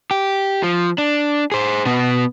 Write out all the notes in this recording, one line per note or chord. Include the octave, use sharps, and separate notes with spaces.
G4
F3
D4
G#4 C5
B2 B3